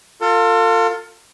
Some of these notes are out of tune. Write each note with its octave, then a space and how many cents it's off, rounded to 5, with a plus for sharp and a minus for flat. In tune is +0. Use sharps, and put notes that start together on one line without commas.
F4 +15 A4 +40